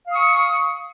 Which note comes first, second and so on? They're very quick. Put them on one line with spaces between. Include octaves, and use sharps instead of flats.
F5 D#6 C#6